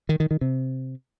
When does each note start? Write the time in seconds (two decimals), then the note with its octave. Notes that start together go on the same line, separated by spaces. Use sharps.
0.09 D#3
0.20 D#3
0.31 D#3
0.41 C3